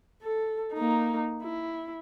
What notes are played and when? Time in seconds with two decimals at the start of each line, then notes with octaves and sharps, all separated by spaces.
0.23 A4
0.73 A#3 D#4
1.43 E4